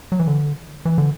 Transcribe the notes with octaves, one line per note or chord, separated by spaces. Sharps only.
F#3
E3
D3
E3
D3